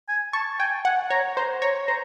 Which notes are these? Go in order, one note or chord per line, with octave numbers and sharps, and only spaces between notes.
G#5
A5 C#6
G5 G#5
F#5 G#5
C#5 A#5
C5 A#5
C#5 A#5
C5 A#5